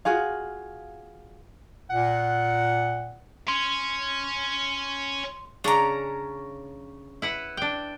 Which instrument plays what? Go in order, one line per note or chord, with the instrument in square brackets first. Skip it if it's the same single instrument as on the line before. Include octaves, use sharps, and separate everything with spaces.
[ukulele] F4 F#4 G#4 F5
[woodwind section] A#2 F#5
[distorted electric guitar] C#4 [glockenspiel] C6
[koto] C#3 D4 [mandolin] C#4 A#5
[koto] E4 B4 F#5
D4 G5